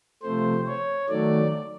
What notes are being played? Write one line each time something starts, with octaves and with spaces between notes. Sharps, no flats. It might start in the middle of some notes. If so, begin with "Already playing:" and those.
C3 F3 A3 C5
C#5
D#3 F#3 A3 D5